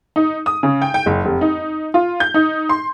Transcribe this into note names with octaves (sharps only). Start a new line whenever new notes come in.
D#4
D#6
C#3
G5
G5
F#1
F1
D#4
F4
G6
D#4
C6